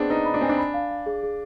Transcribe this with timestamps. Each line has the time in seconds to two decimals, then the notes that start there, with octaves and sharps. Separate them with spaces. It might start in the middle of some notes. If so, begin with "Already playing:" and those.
Already playing: B3 C4 D4 G#4
0.10 D#4 B4
0.25 B5
0.34 D4
0.41 C4 G#5
0.49 D4
0.58 B5
0.74 F5
0.91 F5
1.06 G#4
1.23 G#4